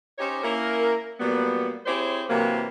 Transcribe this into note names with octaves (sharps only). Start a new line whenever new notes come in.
C#4 D#4 G4 C5 C#5
A#3 C#4 E4 A#4
A#2 F#3 G3 B3
C4 E4 G4 G#4 C5 C#5
C3 E3 F#3 A#3